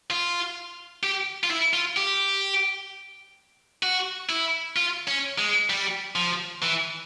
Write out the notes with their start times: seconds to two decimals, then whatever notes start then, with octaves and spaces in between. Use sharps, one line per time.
0.11 F4
1.03 G4
1.44 F4
1.50 E4
1.73 F4
1.97 G4
3.83 F#4
4.29 E4
4.76 F4
5.08 C#4
5.38 G#3
5.70 G3
6.15 F3
6.62 E3